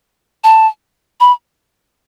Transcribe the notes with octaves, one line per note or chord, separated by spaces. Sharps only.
A5
B5